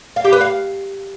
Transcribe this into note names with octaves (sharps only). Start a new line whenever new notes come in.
F5
G4
B4
F5